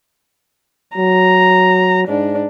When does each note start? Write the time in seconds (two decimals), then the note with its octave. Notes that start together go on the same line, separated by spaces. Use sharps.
0.97 F#3 A#5
2.08 G#2 D4